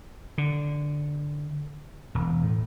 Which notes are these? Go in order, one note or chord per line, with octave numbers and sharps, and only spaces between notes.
D3
E1
A2